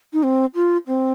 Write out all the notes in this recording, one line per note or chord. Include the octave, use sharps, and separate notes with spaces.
D#4
C4
F4
C4